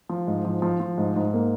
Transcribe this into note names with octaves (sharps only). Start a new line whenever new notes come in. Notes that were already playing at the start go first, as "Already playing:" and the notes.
F3
G#2
F3
F3
F3
G#2
G#2
A#3